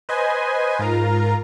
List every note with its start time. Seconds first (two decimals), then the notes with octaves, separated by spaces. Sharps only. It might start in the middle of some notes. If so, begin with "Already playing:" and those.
0.09 B4 C5 D#5 G#5
0.79 G#2 F4 A#4 A#5